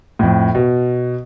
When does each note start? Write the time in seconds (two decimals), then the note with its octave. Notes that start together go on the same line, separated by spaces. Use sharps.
0.19 F2 A2
0.55 B2